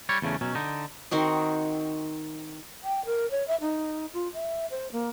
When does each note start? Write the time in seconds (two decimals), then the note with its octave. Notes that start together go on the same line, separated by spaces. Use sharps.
0.09 G3 C#5
0.22 E2 C#3 A3 C#4
0.41 B2 F#3 C#4
0.55 D3 D#4
1.11 D#3 C4 F#4 D#5
2.84 G5
3.06 A#4
3.31 C#5
3.48 E5
3.61 D#4
4.14 F4
4.34 E5
4.71 C5
4.92 A#3